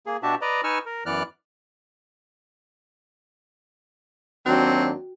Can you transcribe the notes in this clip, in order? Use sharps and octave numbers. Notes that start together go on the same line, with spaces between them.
A#3 G#4
B2 D4 F#4 G4 E5 A5
B4 D5 D#5 A#5
D#4 B4 G#5 C#6 E6 F6
A#4
F#2 E3 B3 D5 F6 F#6
D#2 F#3 C4 D4 F#4 G5